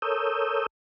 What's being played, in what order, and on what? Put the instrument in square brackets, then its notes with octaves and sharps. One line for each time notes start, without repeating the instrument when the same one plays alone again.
[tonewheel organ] A4 A#4 C#5 D#6 E6 G6